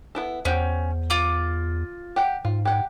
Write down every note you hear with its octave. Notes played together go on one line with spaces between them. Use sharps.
B3 E4 A4
E2 C#4 C5 F#5 G5
F4 D6
G4 F#5 G5
G#2 F4
G4 F#5